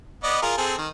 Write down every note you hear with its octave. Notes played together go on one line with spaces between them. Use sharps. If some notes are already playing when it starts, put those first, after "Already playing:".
B3 D5 D#5
F4 G#4 A#4
C4 G#4 A4
D#3